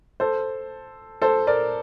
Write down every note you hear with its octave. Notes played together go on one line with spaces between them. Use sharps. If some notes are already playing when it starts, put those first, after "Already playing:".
A4 C5
A4 C5
A#4 D5